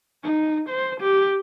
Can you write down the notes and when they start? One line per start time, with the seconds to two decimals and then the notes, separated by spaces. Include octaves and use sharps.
0.24 D#4
0.69 C5
1.01 G4